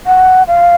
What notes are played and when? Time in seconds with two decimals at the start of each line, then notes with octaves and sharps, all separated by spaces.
0.06 F#5
0.48 F5